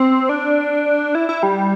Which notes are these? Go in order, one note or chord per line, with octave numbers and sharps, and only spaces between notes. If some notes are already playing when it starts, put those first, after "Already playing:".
Already playing: C4
D4
E4
E4
G3